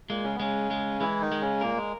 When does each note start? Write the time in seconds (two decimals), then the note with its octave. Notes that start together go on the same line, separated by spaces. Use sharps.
0.09 A#2 G#3 A#3
0.24 C#3 C#4
0.35 B3
0.40 C#3 G#3 C#4
0.71 G#3
1.00 E3 G#3 E4
1.21 D#3 D#4
1.32 G#3
1.41 C#3 C#4
1.61 A#2 A#3 A#4
1.77 G#3